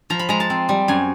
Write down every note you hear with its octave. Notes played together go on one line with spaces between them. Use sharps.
F3 A#5
B5
G#3 A#5
A5
C4
G3
F#2 G#5